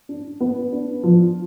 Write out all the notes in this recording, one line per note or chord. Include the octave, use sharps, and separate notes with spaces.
D4
B3
D4
F3